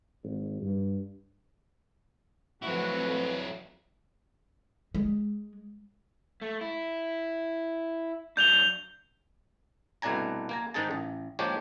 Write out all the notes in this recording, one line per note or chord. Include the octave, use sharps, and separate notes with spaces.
G#1
G2
F3 F#3 A3 C4 E4 F#4 B4
G#3
A3
E4
F#3 D4 G6 F7 G7
C2 B2 A3 D4 G#5 A#5
A#3 G#5 A#5
G#2 D#3 D#4 G#4 A5
A1
F3 G#3 A#3 D4 G4 C#5